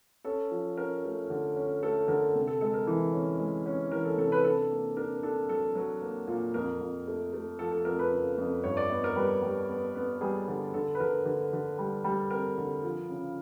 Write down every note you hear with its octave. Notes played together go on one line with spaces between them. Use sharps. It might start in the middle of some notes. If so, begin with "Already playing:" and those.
C#4 A4
F3
C#4 A#4
A3
D3
C#4
A3 A4
D3 A#4
C3
A4
G#3 A4
A#4
E3
C#4
G#3
C#4
E3 A#4
A4
C3 A4
B4
D4 A4
A#3
D4 A#4
D4 A4
F#3 A4
F#3
A#3
A#2
F2 A#4
F2
A3
A3
F3 A4
A4
F2 A#4
B4
C#3
F2
G2 C#5
D5
B3 D#5
A#4
G3 B4
G3
B3
B3
G3 G#4
D3
D3 A4
B4
D3 A#4
D3
D3
G3
G3
C4 A#4
D3
F3
C#3